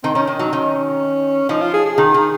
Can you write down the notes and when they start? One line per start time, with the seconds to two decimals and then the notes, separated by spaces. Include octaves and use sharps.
0.03 D#3 C4
0.15 D#3 C#4
0.27 D#3 D#4
0.39 F#3 D#4
0.52 D#3 C#4
1.49 F3 D#4
1.61 F4
1.74 G#4
1.86 G#4
1.98 D#3
2.14 D#3